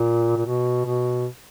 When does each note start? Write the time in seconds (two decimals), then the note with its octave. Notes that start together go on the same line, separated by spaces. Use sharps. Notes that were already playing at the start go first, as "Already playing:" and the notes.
Already playing: A#2
0.37 A#2
0.46 B2
0.85 B2